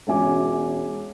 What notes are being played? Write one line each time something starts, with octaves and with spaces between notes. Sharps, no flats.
E1 C#4 F#4 E5 G#5 D6